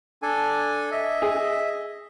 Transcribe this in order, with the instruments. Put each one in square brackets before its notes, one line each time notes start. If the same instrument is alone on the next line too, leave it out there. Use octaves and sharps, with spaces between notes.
[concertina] D4 A4 G#5
D#5 E5
[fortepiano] G#4